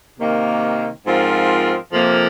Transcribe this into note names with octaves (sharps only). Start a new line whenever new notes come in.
C3 D#3 A#3
G#2 F3 C4 F4 A#4
F2 C3 F3 A#3